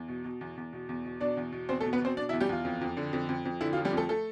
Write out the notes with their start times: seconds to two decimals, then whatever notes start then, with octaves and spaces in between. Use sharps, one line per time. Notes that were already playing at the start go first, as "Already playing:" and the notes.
Already playing: E2
0.08 B2
0.24 B2
0.41 E2
0.57 E2
0.73 B2
0.89 E2
1.05 B2
1.20 B2 D4 D5
1.37 E2
1.52 B2
1.69 E2 C4 C5
1.80 A3 A4
1.85 B2
1.93 B3 B4
2.01 B2 C4 C5
2.17 B2 D4 D5
2.29 E4 E5
2.33 E2
2.41 G3 G4
2.49 E2 F4
2.65 F2
2.81 F2
2.97 D3
3.13 F2
3.29 F2
3.45 F2
3.61 D3 E4
3.73 F4
3.77 F3
3.85 G3 G4
3.93 F2 A3 A4
4.09 A3 A4